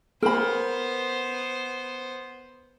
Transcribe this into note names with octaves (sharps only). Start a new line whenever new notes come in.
B3 A#4 C5 B5